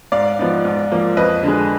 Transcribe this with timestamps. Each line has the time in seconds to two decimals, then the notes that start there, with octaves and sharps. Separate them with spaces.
0.12 G#2 D5 F5
0.39 F3 B3 D#4
0.65 G#2
0.92 F3 A#3
1.17 F2 B4 D#5
1.43 D3 G#3